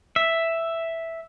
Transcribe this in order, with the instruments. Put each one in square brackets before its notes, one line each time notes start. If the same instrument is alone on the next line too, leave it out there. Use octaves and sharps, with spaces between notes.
[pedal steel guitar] E5